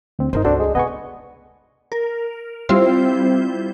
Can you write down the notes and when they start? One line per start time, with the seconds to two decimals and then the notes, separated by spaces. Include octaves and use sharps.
0.19 D2 C4
0.33 G1 D#4 A#4 C5
0.45 C#2 D4 F#4 A4 C5
0.59 G#3
0.75 E1 B3 D#5 G#5 C#6
1.92 A#4
2.69 G3 C4 E4 F4 C5